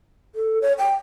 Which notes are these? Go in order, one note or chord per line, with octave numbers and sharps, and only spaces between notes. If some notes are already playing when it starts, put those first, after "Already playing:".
A4
C#5
G5